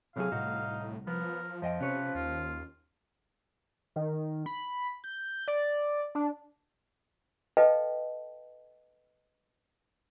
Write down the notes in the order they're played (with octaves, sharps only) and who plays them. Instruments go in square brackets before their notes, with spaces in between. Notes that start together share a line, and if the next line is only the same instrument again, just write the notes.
[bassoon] A2 [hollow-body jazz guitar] C3 F#3 G#4 [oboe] F5
[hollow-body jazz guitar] C2 F#4 [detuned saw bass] A2 [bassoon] D#4
[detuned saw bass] F3 [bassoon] B3 [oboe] A#4
[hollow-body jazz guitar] F2 D#5 G5 [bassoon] F3
[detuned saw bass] C3 [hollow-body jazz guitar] C#4 C#5 [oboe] B4
[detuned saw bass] D#2 [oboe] F4
[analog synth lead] D#3
B5
G6
D5
D4
[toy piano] A4 B4 D#5 F5 G5 A5